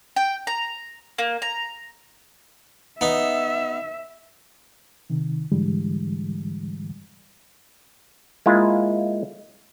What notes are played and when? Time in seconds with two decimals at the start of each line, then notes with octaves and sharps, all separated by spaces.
0.16 G5
0.47 A#5
1.18 A#3
1.42 A#5
3.01 B3 D#4 E5
5.10 C3 D#3
5.52 G#2 D3 E3 G3 G#3
8.46 G#3 A#3 E4 F4